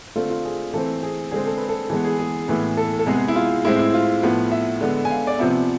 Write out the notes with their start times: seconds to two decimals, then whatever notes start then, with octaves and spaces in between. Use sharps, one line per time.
0.16 D3 A3 C4 F4
0.30 F4
0.45 G#4
0.74 E3 A3 C4 A4
1.03 G#4
1.31 D3 G#3 C4 G#4
1.46 A4
1.58 B4
1.69 A4
1.90 E3 G#3 B3 A4
2.05 G#4
2.19 G#4
2.48 A2 E3 B3
2.77 A4
2.99 A4
3.06 C3 G#3 B3 G#4
3.28 E4
3.36 F4
3.65 A2 G#3 C4 E4
3.79 E4
3.94 F4
4.23 A2 F3 B3
4.52 E5
4.81 D3 G#3 B3
5.05 G#5
5.10 F5
5.27 D5
5.39 C3 F3 B3 E5